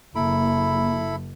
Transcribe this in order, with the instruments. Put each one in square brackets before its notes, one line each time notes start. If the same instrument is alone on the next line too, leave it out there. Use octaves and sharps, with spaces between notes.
[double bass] F#1 [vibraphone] A#3 [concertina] E4 A4 B5